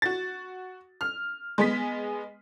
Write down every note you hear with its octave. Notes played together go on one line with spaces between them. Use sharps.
F#4 A6
F6
G#3 B3 B6